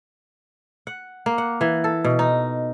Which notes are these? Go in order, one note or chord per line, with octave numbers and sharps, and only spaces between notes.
F#5
A#3
F#5
E3
A4
B2
D#4